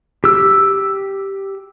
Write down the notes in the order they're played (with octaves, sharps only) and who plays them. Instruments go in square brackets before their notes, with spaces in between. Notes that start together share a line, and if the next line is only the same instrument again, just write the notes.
[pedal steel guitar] G4 E6